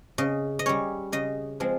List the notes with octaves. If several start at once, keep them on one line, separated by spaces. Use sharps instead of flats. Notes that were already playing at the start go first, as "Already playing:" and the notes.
C#3 D#5
D#5
G3 C#4 C#5
C#3 D#5
F3 G#3 C4